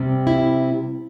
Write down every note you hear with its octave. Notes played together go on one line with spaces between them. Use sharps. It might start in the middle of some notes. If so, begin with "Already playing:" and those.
Already playing: C3 G3 C4
E4